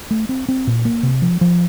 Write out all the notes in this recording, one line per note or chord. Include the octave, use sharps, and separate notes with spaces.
A3
C4
C4
A#2
A#3
C3
F3
F3